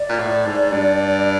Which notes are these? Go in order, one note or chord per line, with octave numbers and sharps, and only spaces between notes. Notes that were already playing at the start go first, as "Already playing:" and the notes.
Already playing: D5
A#2
A2
G#2
G2